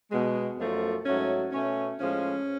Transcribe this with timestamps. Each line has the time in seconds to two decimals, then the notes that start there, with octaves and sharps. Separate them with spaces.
0.11 B2 G#3
0.58 F#2 F3 A3
1.05 G#2 F#3 A3 C#4
1.52 B2 A3 C#4
2.00 A2 F3 G#3 C#4